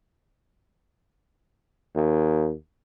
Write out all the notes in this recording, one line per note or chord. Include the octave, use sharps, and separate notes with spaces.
D#2